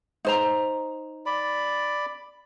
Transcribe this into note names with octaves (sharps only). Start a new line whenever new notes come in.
D#4 C5 A#5
D5 B5